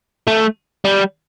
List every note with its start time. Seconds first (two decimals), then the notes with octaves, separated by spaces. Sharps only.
0.28 A3
0.85 G3